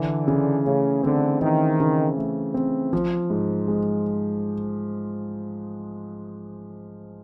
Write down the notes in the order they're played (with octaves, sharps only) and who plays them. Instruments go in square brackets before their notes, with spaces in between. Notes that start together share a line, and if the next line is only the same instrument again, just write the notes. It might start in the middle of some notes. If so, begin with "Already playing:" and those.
Already playing: [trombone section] D3 [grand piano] E3
[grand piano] C#3
[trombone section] C#3 [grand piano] A3
[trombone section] D3 [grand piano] C4
[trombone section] D#3 [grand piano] E3
[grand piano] C#3
A3
C4
F3
G#2
G#3